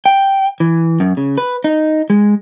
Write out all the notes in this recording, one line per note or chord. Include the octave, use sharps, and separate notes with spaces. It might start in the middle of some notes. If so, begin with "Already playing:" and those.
G5
E3
F#2
C#3
B4
D#4
G#3